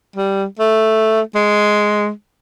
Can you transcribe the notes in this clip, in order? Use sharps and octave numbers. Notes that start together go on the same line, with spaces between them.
G3
A3
G#3